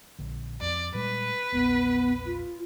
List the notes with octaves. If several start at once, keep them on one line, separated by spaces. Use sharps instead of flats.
A#1 D3
F2 D5
A#2 G3 G#3 B4
E1 A#1 B3
F4